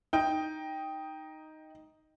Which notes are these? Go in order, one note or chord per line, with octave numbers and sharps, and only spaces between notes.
D#4 G5